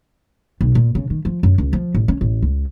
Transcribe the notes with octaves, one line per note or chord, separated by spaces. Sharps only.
B1
A#2
C#3
D#3
F3
F#2
C#2
F3
A1
C#4
A1
C#2